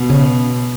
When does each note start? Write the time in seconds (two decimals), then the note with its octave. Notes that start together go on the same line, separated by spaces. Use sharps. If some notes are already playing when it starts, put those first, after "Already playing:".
Already playing: B2
0.10 C#3